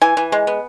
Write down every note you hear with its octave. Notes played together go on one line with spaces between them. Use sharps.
E3 G#5
E3
G#3
B3